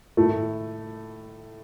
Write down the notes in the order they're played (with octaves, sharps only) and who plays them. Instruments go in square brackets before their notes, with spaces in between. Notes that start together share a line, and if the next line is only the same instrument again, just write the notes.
[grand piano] A2 A3 E4